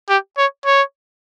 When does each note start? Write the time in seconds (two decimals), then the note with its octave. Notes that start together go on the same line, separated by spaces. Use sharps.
0.09 G4
0.38 C#5
0.65 C#5